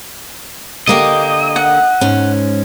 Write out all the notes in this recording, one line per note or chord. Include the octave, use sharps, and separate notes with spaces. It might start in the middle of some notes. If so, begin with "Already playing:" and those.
D3 A#3 G4 D#5
F#5
G#2 C#4